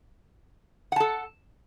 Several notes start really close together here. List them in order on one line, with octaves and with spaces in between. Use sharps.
F#5 A5 A4